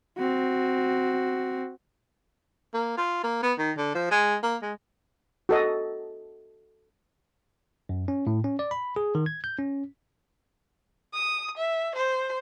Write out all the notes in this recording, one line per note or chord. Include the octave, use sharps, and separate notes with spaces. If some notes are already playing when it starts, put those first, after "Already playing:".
C4 F#4
A#3
F4
A#3
B3
D#3
D3
F3
G#3
A#3
G#3
F#4 A4 D#5
F#2
C#4
A2
C#4
D5
B5
G#4
D#3
G#6
G6
C#4
D#6
E5
C5